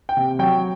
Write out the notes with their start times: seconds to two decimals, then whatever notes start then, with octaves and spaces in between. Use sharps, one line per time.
0.09 G5
0.17 C3
0.39 F#3 G5